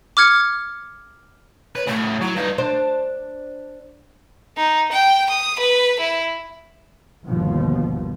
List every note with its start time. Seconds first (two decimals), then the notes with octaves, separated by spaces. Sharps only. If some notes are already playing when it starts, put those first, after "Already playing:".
0.17 D6 F6 G#6 C#7
1.75 B4 C#5
1.87 A2 C#3 A3
2.21 F#3 E4
2.36 G2 D#4 B4
2.58 D4 C5
4.57 D#4
4.92 G5
5.30 D#6
5.59 B4
6.00 E4
7.23 G1 D#2 B2 F3